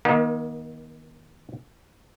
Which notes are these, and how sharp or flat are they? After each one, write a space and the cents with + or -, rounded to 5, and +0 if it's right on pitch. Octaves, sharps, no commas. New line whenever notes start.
D#3 +15 A#3 +45